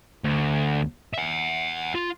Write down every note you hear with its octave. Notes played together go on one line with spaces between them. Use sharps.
D2
E5 F#5
F4